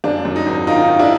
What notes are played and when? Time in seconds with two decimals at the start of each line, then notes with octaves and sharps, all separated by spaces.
0.04 F#2 D4
0.25 F#2
0.36 D#4
0.46 G#1
0.67 D#3 D#4 F4
0.89 D#3
0.99 D4 E4